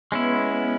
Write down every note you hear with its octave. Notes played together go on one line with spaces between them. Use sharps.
G#3 B3 C#4 E4